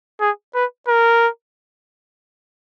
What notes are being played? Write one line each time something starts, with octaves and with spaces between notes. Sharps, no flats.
G#4
B4
A#4